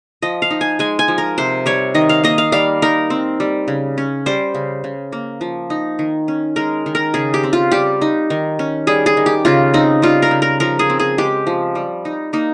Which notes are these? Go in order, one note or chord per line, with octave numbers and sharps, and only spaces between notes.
F3 D#5
F5
D#4
G#5
G#3 G#5
G#5
F3
A#4
C3 C5
G3 C#5
D#3 D#5
F5
A#3 D#5
F5
G3 F5
D#4 A#4
C4
G3
C#3
C#4
G3 C5
C#3
C#3
A#3
F3
D#4
D#3
C#4
G#3 A#4
D#3
A#4
C#3 G#4
G4
C4
F4
G3 G4
D#4
D#3
C#4
G3 G#4
G#4
D#3
G4
C#3 F4
C4 D#4
G3 F4
A#4
C#3
A#4
F3 A#4
G#4
C4
G#4
G#3 G4
F3
G3
D#4
A#3 D#4